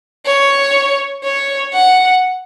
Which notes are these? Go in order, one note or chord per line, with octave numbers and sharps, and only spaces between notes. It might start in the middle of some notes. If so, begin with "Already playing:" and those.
C#5
C#5
F#5